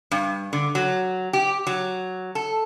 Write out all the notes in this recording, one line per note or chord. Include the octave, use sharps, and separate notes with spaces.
G2
D3
F#3
G4
F#3
A4